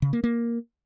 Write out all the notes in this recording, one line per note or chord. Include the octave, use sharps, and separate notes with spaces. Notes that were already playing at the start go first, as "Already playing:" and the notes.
C#3
A#3
A#3